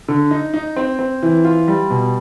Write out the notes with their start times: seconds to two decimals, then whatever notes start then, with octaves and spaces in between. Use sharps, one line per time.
0.08 D3
0.31 D#4
0.54 D#4
0.76 C4
0.99 C4
1.23 E3
1.45 F4
1.68 G3
1.90 B2